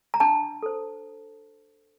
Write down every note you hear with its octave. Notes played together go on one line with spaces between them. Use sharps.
A#5
D4 A5
A4 C5